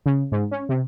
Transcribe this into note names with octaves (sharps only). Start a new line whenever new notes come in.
C#3
G#2
C#4
C3